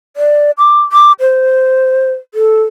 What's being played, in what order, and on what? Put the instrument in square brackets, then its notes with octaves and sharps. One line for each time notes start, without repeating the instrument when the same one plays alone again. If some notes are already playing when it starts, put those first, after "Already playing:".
[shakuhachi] D5
D6
D6
C5
A4